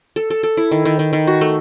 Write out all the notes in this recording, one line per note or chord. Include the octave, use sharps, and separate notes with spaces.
A4
A4
A4
E4
D#3
D#3
D#3
D#3
F#4
A3